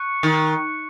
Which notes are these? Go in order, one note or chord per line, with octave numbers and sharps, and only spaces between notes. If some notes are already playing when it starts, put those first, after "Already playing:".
Already playing: C#6 F#6 C#7
D#3